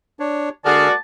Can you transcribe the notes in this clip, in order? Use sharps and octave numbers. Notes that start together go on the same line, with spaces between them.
D4 C#5
D3 G#3 A#3 F#4 G#4 D5 A5 F6